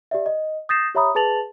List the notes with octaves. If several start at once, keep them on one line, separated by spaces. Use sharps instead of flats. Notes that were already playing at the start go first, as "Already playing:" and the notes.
G4 D5 E5
D#5
D#6 G6 A6 A#6 C7 E7
G4 C#5 E5 A#5 B5 D#6
G#4 B4 A5 A6 F7 F#7